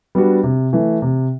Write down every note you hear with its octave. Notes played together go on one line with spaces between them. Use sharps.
G3 B3 D4 F#4
C3
E3 A3
C3